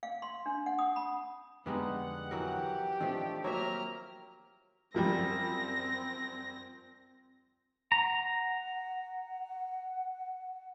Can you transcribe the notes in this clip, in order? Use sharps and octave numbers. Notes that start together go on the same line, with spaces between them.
F5
C6
D4
F#5
D#6
B5
F2 D3 G3 G#3 B3 D#4 F#5
E3 F#3 G4 A#4
D#3 F3 A3 C4 D4
F#3 A#3 C5 C#5 E5 A#5 F6
F#2 F3 G3 C4 A#6
F#5 A#5